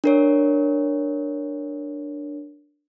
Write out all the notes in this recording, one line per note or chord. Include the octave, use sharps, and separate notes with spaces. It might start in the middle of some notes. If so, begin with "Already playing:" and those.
D4 A#4 C#5